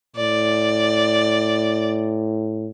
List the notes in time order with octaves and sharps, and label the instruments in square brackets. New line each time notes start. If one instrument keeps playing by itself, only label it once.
[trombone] A2 [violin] D5